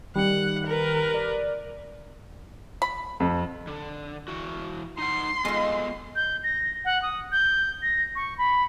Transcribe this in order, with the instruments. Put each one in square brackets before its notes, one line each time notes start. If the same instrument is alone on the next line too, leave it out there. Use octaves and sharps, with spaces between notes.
[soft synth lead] D#3 [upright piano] G3 [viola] F#5
[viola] A#4 B4
[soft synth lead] D5
[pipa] B5
[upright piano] F2
[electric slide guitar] D3
E3 F#4
[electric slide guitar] D#4 F#5 [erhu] C6
[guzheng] G#3 F4 [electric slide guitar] B3 A4 D#5
[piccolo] G6
A#6
F#5
D#6
G6
A#6
C#6
B5